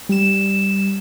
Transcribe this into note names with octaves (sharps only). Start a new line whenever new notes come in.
G3 E7